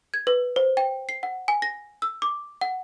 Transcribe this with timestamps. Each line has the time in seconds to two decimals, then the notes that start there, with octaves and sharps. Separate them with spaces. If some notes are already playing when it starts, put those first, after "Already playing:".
0.14 G#6
0.27 B4
0.56 C5
0.77 G5
1.09 C7
1.23 F#5
1.48 G#5
1.62 A#6
2.02 E6
2.22 D6
2.61 F#5